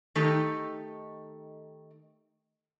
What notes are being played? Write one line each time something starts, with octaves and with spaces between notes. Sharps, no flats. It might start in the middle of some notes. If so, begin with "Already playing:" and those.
D#3 A3 D#4 G4 A4